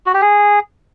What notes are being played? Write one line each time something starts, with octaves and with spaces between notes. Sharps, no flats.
F#4
G4
G#4